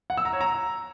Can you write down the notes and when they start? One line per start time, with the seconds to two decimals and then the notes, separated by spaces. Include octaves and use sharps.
0.10 F#5
0.17 E6
0.25 A#5
0.33 C#5
0.41 A#5